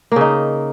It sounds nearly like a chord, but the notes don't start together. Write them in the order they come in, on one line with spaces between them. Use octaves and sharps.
A#3 C#3 D#4